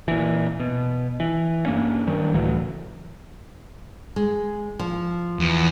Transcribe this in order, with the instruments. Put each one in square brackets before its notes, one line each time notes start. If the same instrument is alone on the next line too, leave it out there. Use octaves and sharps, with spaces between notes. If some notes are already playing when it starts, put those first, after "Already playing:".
[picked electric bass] A#2 E3
B2
E3
G2 A#3 C#4
G2 D#3 G3
C#2 A2 E3 F#3
[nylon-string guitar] G#3
F3
[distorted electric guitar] E2